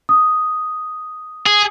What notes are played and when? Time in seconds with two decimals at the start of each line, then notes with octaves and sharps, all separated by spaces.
0.09 D#6
1.46 G#4